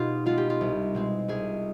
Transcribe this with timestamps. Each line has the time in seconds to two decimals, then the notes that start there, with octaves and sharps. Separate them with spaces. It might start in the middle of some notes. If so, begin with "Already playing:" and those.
Already playing: B2 D#4 F4 G4
0.26 G#3 B3 F4
0.38 G4
0.50 F4
0.61 C2
0.95 B2 G#3 C4
1.28 C2 G#4